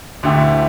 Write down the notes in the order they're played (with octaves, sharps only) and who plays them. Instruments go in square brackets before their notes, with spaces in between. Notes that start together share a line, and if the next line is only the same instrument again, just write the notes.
[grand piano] D2 D3 A3 E4 G4